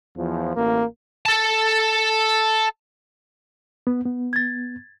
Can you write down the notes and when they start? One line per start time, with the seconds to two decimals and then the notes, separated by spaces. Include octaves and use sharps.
0.16 E2 F3
0.56 A1 A#3
1.26 A4 A5
3.87 B3
4.05 B3
4.33 G#6 A6